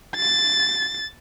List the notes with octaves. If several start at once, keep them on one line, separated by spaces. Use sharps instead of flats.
A6